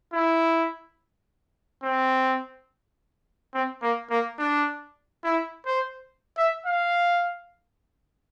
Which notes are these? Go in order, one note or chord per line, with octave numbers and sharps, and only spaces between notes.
E4
C4
C4
A#3
A#3
D4
E4
C5
E5
F5